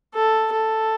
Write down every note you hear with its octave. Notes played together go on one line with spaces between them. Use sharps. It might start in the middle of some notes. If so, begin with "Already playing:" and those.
A4
A4